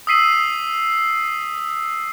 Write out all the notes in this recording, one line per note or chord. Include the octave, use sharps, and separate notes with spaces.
D#6 E6 B6 C7 D#7 F#7